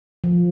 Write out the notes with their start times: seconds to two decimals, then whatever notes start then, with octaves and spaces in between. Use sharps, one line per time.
0.24 F3